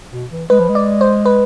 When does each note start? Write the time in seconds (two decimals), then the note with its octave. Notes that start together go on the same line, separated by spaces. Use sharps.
0.12 B2
0.31 E3
0.50 G#3 B4
0.59 F3
0.69 G#3
0.75 D5
1.01 C5
1.25 B4